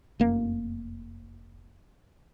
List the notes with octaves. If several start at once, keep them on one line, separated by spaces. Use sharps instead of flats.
F1 F#2 A#3